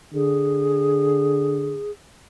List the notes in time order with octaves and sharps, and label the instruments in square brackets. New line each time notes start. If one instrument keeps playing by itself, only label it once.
[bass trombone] D3 [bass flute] G#4